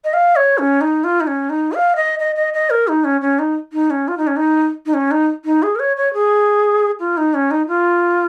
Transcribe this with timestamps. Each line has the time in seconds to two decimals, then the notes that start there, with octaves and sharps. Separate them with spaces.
0.04 D#5
0.13 F5
0.36 C#5
0.58 C#4
0.81 D#4
1.04 F4
1.21 D#4
1.27 C#4
1.50 D#4
1.73 F5
1.96 D#5
2.19 D#5
2.36 D#5
2.54 D#5
2.70 A#4
2.88 D#4
3.04 C#4
3.21 C#4
3.39 D#4
3.73 D#4
3.90 C#4
4.08 F4
4.18 D#4
4.27 C#4
4.37 D#4
4.86 D#4
4.94 C#4
5.11 D#4
5.45 D#4
5.63 G#4
5.75 A#4
5.80 C#5
5.97 C#5
6.14 G#4
7.00 F4
7.17 D#4
7.34 C#4
7.51 D#4
7.68 F4